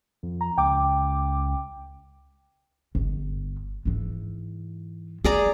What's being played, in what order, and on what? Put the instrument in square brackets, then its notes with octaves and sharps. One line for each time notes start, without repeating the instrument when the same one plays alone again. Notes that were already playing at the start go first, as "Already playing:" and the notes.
[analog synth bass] F2
[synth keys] A#5
[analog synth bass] C#2 [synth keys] G5 D6
[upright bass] G1
G#2 E3
[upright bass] A3 [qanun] G#4 D5 A#5